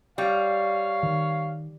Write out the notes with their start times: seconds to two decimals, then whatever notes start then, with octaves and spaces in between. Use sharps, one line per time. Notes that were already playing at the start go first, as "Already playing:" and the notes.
0.18 G3 C#5 F5
1.03 D#3